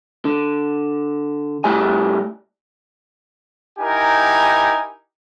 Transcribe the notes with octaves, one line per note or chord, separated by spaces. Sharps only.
D3
A2 G3 G#5
D#4 E4 G4 A#4 G#5